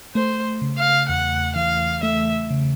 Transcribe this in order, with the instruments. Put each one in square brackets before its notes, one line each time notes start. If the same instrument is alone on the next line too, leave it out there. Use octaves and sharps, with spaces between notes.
[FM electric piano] A3 [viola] C5
[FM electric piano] C#3
[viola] F5
[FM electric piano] E2 [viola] F#5
[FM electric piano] E3 [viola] F5
[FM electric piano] A3 [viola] E5
[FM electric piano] C#3